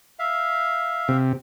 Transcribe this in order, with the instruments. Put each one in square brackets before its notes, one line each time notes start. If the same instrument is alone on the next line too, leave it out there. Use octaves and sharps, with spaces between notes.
[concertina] E5 F5
[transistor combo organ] C3